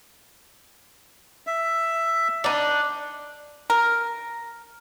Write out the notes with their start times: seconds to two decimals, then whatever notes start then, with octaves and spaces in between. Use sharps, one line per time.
1.47 E5
2.44 D4 D#4
3.70 A#4